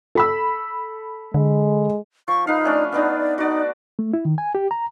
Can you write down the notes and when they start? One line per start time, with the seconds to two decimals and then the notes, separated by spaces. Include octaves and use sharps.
0.15 A4 B5 E6
1.34 D3 G#3
2.28 F3 C#6
2.47 D#4 B4 F5
2.64 A3 C#4 D4
2.92 B3 D4 D#4 D5
3.38 D#4 F#4 D5
3.99 A3
4.13 E4
4.25 D#3
4.38 G#5
4.55 G4
4.71 A#5